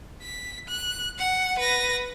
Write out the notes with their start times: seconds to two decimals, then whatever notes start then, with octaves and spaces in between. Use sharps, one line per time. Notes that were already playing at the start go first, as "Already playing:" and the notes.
0.22 B6
0.68 F#6
1.18 F#5
1.59 B4 A#6